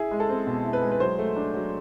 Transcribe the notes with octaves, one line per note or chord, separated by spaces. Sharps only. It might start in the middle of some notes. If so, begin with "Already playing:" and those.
Already playing: E4 G#4
G#3
A4
C4
B2
E4
B4
G#3
B4
F#3 C5
A3
D4
F#3